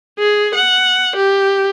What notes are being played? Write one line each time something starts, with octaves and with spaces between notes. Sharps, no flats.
G#4
F#5
G4